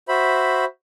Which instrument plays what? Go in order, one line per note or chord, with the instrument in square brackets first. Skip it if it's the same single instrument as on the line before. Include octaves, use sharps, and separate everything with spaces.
[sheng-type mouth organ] F#4 C5 E5 B5